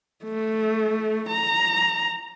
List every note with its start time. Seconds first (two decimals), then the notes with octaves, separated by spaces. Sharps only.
0.24 A3
1.29 A#5